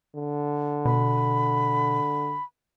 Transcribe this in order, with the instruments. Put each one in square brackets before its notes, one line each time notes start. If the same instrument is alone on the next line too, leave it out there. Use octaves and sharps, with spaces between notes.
[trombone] D3
[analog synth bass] B2 [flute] B5